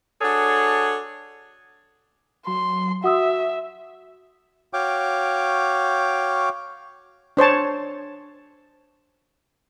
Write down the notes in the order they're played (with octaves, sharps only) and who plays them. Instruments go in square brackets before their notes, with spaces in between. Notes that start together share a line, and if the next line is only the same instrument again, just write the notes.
[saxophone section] D4 F#4 G#4 A4 C#5
[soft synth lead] F#3 [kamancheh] C6
[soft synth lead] F#4 [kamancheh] E5 [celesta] F#5 D#6 E6
[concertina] F#4 C#5 F5 G5 D6
[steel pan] D4 C5 C#5 A5